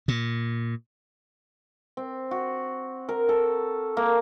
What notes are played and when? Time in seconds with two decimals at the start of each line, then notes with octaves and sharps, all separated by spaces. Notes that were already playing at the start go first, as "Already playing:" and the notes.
0.08 A#2
1.97 C4
2.31 F#4
3.09 A#4
3.29 A4
3.97 A#3